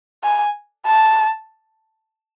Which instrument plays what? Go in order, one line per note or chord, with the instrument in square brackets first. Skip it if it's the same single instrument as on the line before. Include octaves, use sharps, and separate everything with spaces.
[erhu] G#5
A5